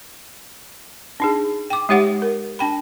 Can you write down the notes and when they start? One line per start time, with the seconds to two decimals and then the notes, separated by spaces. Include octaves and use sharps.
1.20 D4 D#4 G#4
1.70 G5 D6
1.89 G#3 D#4 G4 C#5 E5 F#5
2.22 A#4
2.59 D4 G5 B5